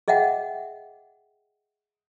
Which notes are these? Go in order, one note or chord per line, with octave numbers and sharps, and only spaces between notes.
G#4 D#5 E5 F#5 G5